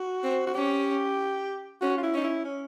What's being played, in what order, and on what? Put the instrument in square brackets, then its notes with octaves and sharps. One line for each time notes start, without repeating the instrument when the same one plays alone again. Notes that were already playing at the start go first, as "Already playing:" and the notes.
Already playing: [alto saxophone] F#4
[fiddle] C4
[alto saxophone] F#4
[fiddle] C#4 [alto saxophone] G4
[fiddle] C#4 [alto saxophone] F#4
[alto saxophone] F4
E4
[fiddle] C#4 [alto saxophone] D#4
[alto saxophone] E4
C#4